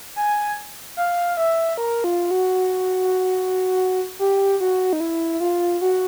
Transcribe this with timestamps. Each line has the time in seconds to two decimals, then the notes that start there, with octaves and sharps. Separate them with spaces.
0.16 G#5
0.97 F5
1.37 E5
1.78 A#4
2.04 F4
2.31 F#4
4.19 G4
4.60 F#4
4.93 D#4
5.00 E4
5.40 F4
5.81 F#4